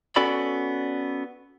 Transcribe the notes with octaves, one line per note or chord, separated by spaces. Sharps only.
B3 C#4 F#4 A4 D5 B5